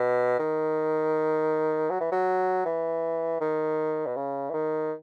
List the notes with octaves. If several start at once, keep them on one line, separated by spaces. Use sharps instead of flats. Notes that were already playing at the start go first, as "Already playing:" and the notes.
Already playing: B2
D#3
F#3
E3
F#3
E3
D#3
B2
C#3
E3
D#3